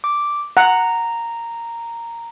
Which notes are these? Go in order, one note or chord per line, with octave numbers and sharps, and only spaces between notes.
D6
F#5 A#5